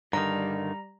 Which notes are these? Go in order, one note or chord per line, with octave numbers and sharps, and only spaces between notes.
G2 D3 D#3 G3 A#5